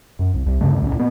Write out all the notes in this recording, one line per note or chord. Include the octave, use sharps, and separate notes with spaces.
F#2
C2
C2
D2 G2 C#3 A3
C#2 A2 C4 C#4
A#2 B3